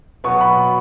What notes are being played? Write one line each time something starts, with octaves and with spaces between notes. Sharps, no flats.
B2 F#3 B3 C#6
B5